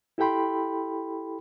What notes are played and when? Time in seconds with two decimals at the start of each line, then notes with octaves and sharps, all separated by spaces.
0.18 E4 G4 A4 G5 B5 C6